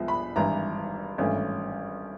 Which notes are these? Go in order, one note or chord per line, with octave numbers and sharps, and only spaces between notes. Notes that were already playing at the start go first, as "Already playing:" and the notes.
Already playing: C2 F3 G#3 B3
B5
G#1 G2 E3 A#5
G#1 G2 E3 A3 C#4